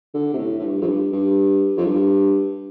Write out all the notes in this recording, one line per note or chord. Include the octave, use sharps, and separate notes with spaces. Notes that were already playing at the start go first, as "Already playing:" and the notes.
D3
C3
A2
A2
G2
F2
G2
G2
F2
G2